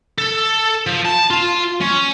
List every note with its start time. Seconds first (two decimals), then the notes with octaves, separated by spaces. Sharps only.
0.18 A4
0.87 F3
1.05 A5
1.30 F4
1.81 C#4